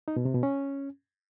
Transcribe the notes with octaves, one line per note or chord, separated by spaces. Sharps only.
D#4
B2
C3
B2
C#4